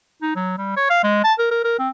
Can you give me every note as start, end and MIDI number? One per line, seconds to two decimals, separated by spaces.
0.22 0.35 63
0.36 0.54 54
0.58 0.72 55
0.77 0.88 73
0.90 1.03 77
1.03 1.23 56
1.24 1.34 81
1.39 1.46 70
1.51 1.63 70
1.64 1.76 70
1.79 1.89 60